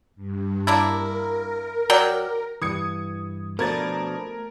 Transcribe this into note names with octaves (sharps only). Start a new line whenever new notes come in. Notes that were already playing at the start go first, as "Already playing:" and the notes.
G2
A#3 D4 E4 A#4
A#4
F#3 D5 G5
G2 E3 D#6 G#6 C#7
B2 F3 A3 D4 A#4 G#6 A6